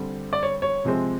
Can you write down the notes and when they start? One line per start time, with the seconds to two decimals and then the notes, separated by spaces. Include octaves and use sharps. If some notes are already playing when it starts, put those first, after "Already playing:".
Already playing: D3 G3 C4
0.33 D5
0.43 C#5
0.62 C#5
0.85 C3 F3 G#3 C4